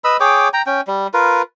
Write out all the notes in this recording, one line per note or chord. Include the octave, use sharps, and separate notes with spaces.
B4 D#5 B5 E6
G#4 C#5 G5 D6
G5 A#5
C#4 G5
G3
F4 A#4 B4